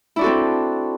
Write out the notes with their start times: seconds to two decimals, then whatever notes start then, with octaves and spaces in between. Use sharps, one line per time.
0.16 E4
0.19 D4
0.21 F#4
0.24 A4
0.26 C4